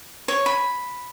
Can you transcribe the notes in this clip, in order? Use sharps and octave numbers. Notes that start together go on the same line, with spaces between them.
C#5
B5